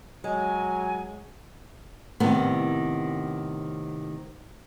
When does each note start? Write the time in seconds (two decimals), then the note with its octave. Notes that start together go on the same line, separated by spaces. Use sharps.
0.24 F#3 G#3 G#5
2.20 A2 C3 D#3 B3